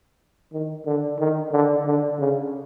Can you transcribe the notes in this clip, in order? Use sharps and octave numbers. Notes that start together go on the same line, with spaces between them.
D#3
D3
D#3
D3
D3
C#3